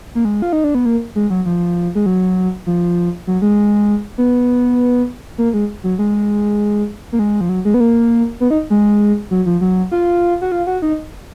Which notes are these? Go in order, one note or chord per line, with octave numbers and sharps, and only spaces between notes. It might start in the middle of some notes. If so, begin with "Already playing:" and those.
A#3
G#3
F4
D#4
D4
B3
A#3
G#3
F#3
F3
G#3
F#3
F3
F#3
G#3
B3
A#3
G#3
F#3
G#3
A#3
G#3
F3
F#3
G#3
B3
A#3
B3
D#4
G#3
F#3
F3
F#3
F4
F#4
F4
F#4
D#4